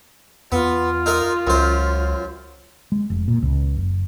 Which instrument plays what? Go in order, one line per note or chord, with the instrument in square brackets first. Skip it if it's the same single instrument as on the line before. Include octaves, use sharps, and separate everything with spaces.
[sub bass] E2 [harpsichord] B3 [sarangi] F4
[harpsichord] D#4 A#4 D#5
[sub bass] C#2 [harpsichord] F#2 C5
[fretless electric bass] G#3
F1
A#2
C#2
F#1